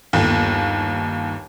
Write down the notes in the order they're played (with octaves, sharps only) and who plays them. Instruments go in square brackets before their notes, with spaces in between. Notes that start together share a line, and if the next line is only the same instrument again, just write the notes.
[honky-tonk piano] G1 D#2